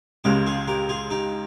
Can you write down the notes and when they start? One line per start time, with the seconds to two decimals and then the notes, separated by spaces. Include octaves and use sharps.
0.24 C#2 C#3 G#3 G4 A#4
0.46 F4 G#4
0.68 G4 A#4
0.89 F4 G#4
1.10 D#4 G4